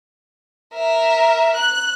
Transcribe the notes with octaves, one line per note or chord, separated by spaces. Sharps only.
A#4 E5
F#6